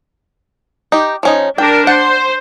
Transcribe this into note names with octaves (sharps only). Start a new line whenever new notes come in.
D#4 G4
F3 C#4 D#4
D4 A#4 G5
C5 F#5